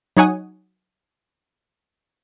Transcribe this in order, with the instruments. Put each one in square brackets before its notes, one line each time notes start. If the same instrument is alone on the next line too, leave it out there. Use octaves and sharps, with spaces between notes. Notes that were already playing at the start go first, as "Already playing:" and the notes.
[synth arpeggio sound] F#3 D#4 C#5 F#5 G#5 D#6